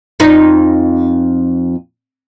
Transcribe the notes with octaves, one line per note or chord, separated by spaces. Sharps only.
F2 D#4